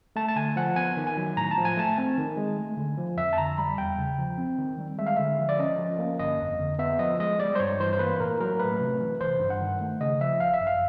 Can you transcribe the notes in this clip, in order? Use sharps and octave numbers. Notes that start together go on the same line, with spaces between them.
A3 A5
A5
D3 G#5
F3 F#5
B3 G#5
D#3
G#5
F#3
A2 A#5
A5
F3
G#5
A3 A5
C4 G#5
D#3
G#3
A3
D3
F3
F2 E5
A5
D3 A#5
G3 B5
E2 G5
C#3
F3
C4
D#3
G3
G#3 E5
F5
D3 E5
F3
D5
C#4 D#5
F3
A#3
G1 D#5
F2
D3
B3 E5
F3 D#5
G#3 D#5
G3 D5
C5
G2 C#5
E3 C5
C5
A#3 B4
A2 A#4
F#3 A#4
A3 B4
C3
E3
G1 C5
G2
F#5
D#3
A3
C#3 D#5
F3 E5
G#1 F5
E5
F#2
F5